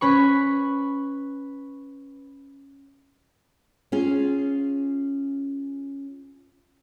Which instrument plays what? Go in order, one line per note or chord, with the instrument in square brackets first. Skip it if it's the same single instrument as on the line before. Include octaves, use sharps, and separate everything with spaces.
[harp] C#4 B4 B5 C#6
[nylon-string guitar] C#4 F4 G#4